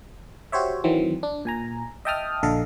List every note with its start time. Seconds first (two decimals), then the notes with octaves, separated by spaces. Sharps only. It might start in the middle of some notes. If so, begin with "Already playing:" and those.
0.52 F#4 G4 C5 C#5 E5
0.84 D#3 E3 F#3 C4
1.23 D4
1.45 A#2 G#5 A#5
2.05 D#5 E5 G5 A5 D#6 F6
2.43 A#1 D3 A4 D#5 F5